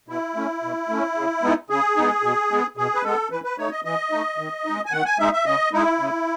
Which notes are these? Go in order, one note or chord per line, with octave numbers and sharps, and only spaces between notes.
B2 E4
A3 C#4
B2
A3 C#4
C#3
G#3 B3 D#4
C#3 G#4
G#3 B3 D#4
B2
G#3 B3
B2 G#4
B4
G#3 B3 A4
E3 B4
B4
A3 D#4 C#5
D#5
E3 D#5
A3 D#4
D#3
G#3 D#4
G#5
D#3 F#5
G#5
G#3 D#4 E5
E5
C#3 D#5
G#3 D#4 E4
C#3